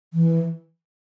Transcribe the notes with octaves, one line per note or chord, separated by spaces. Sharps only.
E3